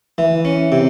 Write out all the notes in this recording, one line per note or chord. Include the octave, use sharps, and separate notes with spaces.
E3
C#4
C3